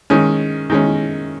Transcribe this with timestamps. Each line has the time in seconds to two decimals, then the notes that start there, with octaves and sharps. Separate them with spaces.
0.10 D#3 G#3 C#4
0.70 D#3 G#3 C#4